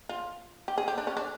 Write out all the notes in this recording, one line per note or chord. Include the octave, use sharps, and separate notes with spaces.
F4
G4
G#4
G4
D4
C#4
D4